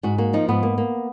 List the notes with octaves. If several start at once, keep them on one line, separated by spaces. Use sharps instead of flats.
G#2 F#4
A#3 F#4
F3 D#4
G#2 B3
A#3
A#3